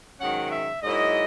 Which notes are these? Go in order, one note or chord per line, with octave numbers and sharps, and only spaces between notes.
G#2 D#3 F#3 C#4 F#5
E5
G#2 F#3 A#3 E4 D#5